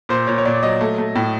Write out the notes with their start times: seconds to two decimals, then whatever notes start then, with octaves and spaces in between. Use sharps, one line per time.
0.09 A#2 C5
0.27 A#2 C#5
0.38 C#5
0.45 A#2 D5
0.63 F#3 D#5
0.81 A3
0.98 A3
1.16 A2